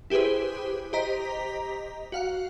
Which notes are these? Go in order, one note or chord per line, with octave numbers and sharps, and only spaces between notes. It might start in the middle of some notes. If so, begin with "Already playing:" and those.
E4 G4 G#4 B4 C5
G4 C5 D#5 A#5 B6
F#4 F5 F#5